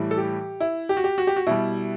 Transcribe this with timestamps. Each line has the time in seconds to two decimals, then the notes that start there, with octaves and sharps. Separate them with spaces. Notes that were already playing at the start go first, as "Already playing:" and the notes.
Already playing: A2 E3 G3
0.11 A4
0.17 G4
0.60 E4
0.89 G4
0.97 F#4
1.04 G4
1.18 F#4
1.27 G4
1.36 F#4
1.47 B2 G3 E4